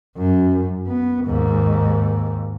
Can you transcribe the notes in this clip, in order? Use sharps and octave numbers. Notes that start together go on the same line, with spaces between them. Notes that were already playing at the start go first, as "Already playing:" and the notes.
F#2
B3
D#2 G#2